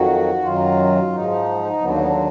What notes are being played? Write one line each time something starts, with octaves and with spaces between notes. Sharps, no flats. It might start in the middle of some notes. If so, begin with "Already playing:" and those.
Already playing: F2 D#3 F#3 F#4
F#2 D#3 F#3 F4
G#2 F3 D#4
D#2 D3 F#3 B3
A#3
B3
D4